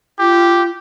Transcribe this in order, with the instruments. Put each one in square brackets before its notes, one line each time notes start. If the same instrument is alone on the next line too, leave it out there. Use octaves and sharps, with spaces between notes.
[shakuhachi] F4 [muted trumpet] G4